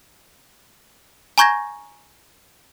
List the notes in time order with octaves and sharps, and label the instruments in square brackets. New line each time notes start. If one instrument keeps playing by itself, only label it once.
[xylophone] G#5 A#5 C#6 G6 G#6 A#6